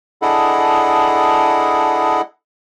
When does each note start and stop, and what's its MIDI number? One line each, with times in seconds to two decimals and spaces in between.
0.22 2.21 62
0.22 2.21 64
0.22 2.21 68
0.22 2.21 69
0.22 2.21 75
0.22 2.21 78